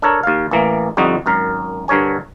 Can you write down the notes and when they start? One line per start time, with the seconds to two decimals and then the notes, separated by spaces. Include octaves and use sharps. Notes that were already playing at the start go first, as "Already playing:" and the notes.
0.02 D4 A4 A#4 C#5
0.23 D#2 F5
0.51 A1 E3 A#3
0.97 G1 F2 G3 D#4 F#4
1.26 G#1 F#2 A#4
1.88 G2 D3 A#4 C#5 G#5